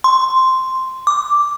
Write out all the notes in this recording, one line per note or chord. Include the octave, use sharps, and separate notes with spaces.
C6
D6